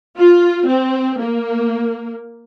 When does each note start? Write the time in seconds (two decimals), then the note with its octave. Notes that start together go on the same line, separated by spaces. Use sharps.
0.18 F4
0.67 C4
1.18 A#3